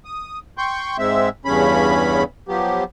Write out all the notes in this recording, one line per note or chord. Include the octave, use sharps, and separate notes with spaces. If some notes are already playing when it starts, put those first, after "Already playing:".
D#6
G5 C6 C#6 G6
G#2 G#3 C4 E5
E2 G2 C#3 C#4 B5
F3 F#3 B3 G4